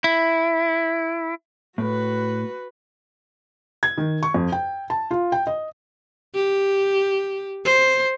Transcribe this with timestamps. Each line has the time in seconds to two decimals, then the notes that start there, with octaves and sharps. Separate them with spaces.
0.04 E4
1.78 A2 F#4 B4
3.83 G#6
3.97 D#3
4.23 C#6
4.34 F2
4.52 G5
4.90 A5
5.11 F4
5.32 G5
5.47 D#5
6.34 G4
7.65 C5